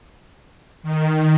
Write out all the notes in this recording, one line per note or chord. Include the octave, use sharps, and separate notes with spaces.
D#3